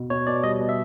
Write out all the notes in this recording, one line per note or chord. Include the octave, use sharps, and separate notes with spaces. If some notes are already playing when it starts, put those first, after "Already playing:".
Already playing: B2
B2 C#5
B2 D5
G3 D#5
B2
E5